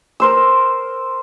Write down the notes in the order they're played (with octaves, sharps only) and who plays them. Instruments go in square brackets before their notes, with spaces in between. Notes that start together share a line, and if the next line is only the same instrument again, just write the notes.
[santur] A#4 C5 E6